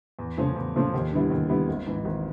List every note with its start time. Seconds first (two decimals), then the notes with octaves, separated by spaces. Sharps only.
0.19 E2
0.38 C#3 F3 A3 C#4
0.56 E2
0.74 C#3 F3 A3 C#4
0.94 D#2
1.12 D3 G3 B3 E4
1.30 D#2
1.49 D3 G3 B3 E4
1.68 G#1
1.87 G#2 E3
2.05 G#1